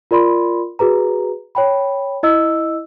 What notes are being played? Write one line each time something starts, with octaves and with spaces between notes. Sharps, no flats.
F4 A#4 D5 B5 C6
F#4 G#4 B4 A#5
C#5 G5 B5
E4 D#5 E6